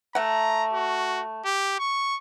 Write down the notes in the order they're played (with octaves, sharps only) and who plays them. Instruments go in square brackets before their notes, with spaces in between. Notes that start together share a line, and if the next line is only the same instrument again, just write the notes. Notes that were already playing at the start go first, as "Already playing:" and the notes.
[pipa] A3 F#5 [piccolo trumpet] A#5
[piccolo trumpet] F#4
G4
C#6